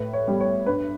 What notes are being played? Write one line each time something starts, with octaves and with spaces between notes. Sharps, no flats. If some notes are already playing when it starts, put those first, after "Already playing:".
Already playing: A2 B4
C#5
G3 B3
C#5
G2 B4